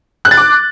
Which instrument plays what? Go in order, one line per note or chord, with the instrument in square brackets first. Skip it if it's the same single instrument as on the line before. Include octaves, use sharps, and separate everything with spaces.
[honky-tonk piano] F#6
A6
D6